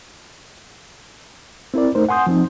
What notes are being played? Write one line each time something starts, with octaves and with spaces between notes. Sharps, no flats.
C4 E4 A#4 D5
A3 D#4 A#4 C5
F#5 G#5 C6 D#6 G6
F3 C4 D#4